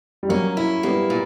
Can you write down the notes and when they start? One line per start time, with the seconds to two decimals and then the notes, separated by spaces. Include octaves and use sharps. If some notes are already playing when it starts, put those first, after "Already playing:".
0.23 G3
0.29 F#3 A#3 C#4
0.57 E4
0.83 G3 A#3 B3
1.10 A#2